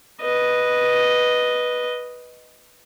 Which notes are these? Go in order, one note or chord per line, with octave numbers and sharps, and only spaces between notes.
B4 D#5